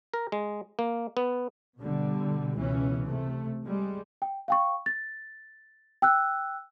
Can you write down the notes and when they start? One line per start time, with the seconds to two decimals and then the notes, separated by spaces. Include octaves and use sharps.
0.14 A#4
0.32 G#3
0.79 A#3
1.17 B3
1.78 B2 D3 G3
2.55 C#2 B2 E3 C#4
3.05 C3 A3
3.65 G3 G#3
4.22 G5
4.48 F5 G5 C#6
4.86 A6
6.02 G5 E6 F#6